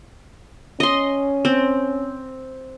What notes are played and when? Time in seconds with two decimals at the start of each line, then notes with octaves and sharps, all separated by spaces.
0.80 C#4 D#5 C6
1.45 C4